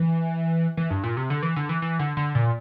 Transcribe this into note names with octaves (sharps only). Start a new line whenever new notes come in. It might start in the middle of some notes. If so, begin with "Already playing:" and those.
Already playing: E3
E3
G2
A#2
C3
D3
E3
D3
E3
E3
D3
D3
A#2